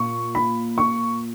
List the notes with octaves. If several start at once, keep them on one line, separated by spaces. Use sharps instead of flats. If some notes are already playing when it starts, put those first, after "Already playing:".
Already playing: A#2 C#6
B5
C#6